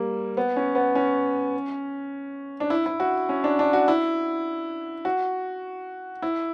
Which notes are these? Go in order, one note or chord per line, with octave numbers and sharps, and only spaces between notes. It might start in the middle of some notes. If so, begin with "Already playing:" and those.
Already playing: G3 A#3
B3
C#4
B3
C#4
D4
E4
E4
F#4
C#4
D4
D4
F#4
E4
F#4
E4